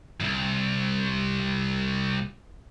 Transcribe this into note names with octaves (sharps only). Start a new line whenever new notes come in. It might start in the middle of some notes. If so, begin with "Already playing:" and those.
C2 F#2